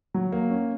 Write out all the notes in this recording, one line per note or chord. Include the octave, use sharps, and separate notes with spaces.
F#3
A#3
C#4